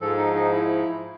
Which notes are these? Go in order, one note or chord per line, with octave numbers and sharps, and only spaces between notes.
G#2 F3 A4
D#4
D#4
E4